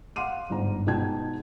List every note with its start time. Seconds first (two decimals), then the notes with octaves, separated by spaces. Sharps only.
0.16 F5 F#5 C6 D6 D#7
0.50 G1 G#2 A#5
0.86 B2 G#3 D#4 G5 A5 G#6